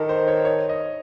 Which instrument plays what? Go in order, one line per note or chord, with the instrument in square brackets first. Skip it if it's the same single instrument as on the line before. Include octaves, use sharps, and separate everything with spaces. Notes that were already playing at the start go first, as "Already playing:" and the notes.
Already playing: [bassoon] D#3 [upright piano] G4 A4 A#4
[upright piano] C5
C#5
C#5
D#5